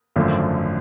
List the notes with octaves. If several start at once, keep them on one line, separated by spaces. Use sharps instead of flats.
G#1 F#2 D3 F3 A3